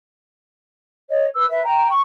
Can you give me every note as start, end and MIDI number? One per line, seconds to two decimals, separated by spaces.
1.09 1.25 73
1.09 1.25 75
1.35 1.45 71
1.35 1.45 88
1.49 1.62 71
1.49 1.62 76
1.63 1.88 79
1.63 1.88 82
1.89 2.00 85